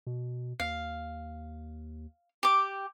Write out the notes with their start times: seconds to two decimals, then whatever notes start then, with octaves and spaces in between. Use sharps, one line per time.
0.07 B2
0.60 D#2 F5
2.43 G4 D6